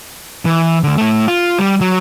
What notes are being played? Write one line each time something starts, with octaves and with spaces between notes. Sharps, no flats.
E3
D3 A3
A3 E4
F4
G3
F#3